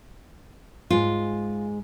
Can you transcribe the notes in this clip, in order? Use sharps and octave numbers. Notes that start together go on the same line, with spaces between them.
G#2 G#3 F4